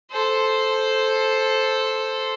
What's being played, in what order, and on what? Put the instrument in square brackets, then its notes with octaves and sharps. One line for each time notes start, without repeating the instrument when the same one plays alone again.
[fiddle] A4 C5